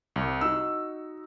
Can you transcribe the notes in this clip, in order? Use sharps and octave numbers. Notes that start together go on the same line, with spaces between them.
C2
D#4 F#4 E6